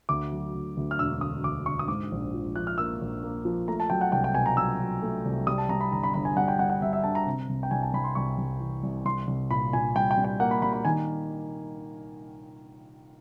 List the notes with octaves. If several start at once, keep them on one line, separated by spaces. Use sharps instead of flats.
D2 D6
F#3
D2
D2
F6
E1 E6
D2 D#6
D2 D6
D3 C#6
D#6
G#2 D6
A#1
F3
F3 F#6
F6
A#3 E6
A#1
A#3
F3
A3 A#5
A5
F#3 G5
F#5
C2 G5
G5
B2 G#5
A#5
F#3 E6
F#3
A3
C2
G3 D#6
A5
G3 A#5
B5
G1 A#5
B5
G1 B5
G#5
G3 F#5
G5
G3 F#5
F#5
G3 E5
E5
D3 A5
A#5
C3
C2
G5
C2 G#5
A5
C2 B5
C6
C2 C#6
C2
E3
C2
C2 C6
C2
A#2 B5
A#2 G#5
G3 G5
G5
G3
G5
A#3 F#5
B5
G3 B5
B5
D#3 G#5